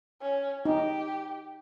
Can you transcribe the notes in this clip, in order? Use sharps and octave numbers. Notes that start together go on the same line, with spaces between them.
C#4
D#4 G4